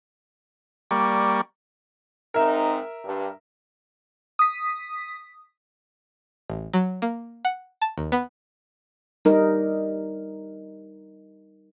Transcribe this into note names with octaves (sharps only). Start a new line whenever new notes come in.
G3 A#3 D5 C#6
G#2 C4 D#4 A#4 E5
G2
D#6 B6
A1
F#3
A#3
F#5
A5
D#2
B3
G3 D#4 A#4